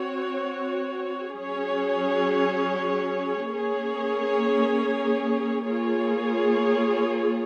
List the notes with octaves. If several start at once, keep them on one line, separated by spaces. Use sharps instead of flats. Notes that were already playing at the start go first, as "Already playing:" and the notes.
Already playing: C4 F#4 C#5
F#3 C#4 G#4 C#5
A#3 C#4 G#4 C#5
A#3 F4 G#4 C#5